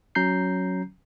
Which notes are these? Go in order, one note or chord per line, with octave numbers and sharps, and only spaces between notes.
F#3 C#4 A#5 G6 C7